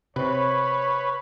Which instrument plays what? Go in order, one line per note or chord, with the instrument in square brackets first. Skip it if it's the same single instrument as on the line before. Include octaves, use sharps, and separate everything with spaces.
[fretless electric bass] C3 [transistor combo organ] B4 [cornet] C#5